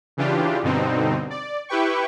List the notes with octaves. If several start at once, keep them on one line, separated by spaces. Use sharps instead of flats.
C#3 E3 D4 F4 G4
G2 B2 D3 C4 D#4
D5
E4 G4 B4 G5 C#6